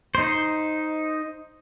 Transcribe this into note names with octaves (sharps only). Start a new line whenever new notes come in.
D#4 C5